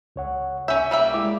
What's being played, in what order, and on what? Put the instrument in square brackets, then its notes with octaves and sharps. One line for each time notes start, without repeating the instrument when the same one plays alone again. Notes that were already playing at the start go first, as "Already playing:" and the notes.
[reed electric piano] C#2 C#5 F#5
[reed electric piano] C2 G6 [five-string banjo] C#4 E5
[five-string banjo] G3 A#3 E5
[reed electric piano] G#3 E4 D6